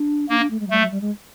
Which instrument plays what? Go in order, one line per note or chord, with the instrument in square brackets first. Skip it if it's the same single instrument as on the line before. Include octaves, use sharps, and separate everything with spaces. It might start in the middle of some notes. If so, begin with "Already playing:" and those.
Already playing: [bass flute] D4
[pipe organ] A#3 [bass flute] D4
[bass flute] D4
A3
G#3
F#3
[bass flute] G3 [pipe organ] A3
[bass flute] F#3
G3
G#3